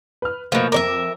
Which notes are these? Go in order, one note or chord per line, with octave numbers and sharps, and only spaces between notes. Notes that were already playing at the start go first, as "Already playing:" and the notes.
B4 F6
B2 F3 A3 A#3
F2 A#4 D5 E5 D6